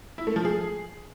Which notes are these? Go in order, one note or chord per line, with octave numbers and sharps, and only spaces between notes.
E4
A3
F3
G#4